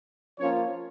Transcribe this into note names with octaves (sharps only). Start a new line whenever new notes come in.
F3 A#3 C#4 F4 C#5